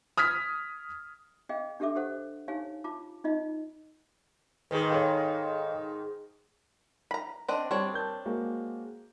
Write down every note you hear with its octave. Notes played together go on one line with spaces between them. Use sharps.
D#6 F6 G#6 B6
G#4 D#5 F5 G5
D4 G4 A4 E5 D6
G4 A4 C5 F#5
D#4 G4 C#5 F5 G#5
F4 A5 D6
D#4 F4 D#5
G#2 D#3 G#4 B4
A4 B4 C#5 F5 G5
A#5 B5
C4 D4 D#5
G3 C4 D4 C#5
A#4 A5 G6
G#3 A#3 F#4